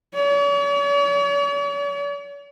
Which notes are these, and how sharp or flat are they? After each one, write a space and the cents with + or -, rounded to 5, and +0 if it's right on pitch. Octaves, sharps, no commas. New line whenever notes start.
C#5 +45